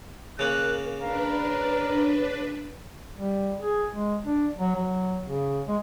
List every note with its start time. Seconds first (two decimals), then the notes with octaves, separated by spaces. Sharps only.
0.39 C#3 A#3 A#4 F#6
1.00 D4 A#4 B4 F5
1.44 C#5
3.16 G3
3.60 G#4
3.92 G#3
4.26 D4
4.59 F#3
4.75 F#3
5.27 C#3
5.68 G#3